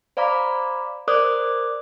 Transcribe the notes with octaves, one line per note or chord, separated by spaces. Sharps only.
C5 D5 F5 A#5 B5 D6
A#4 C5 D5 D6 D#6 F#6